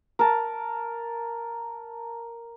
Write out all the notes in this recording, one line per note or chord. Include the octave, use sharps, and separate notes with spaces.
A#4 A5